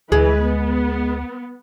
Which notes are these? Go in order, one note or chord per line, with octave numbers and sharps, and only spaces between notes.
D2 E3 G#3 B4
B3